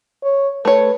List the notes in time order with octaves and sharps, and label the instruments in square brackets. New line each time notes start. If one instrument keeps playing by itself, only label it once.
[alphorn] C#5
[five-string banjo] A3 C#5 [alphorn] B4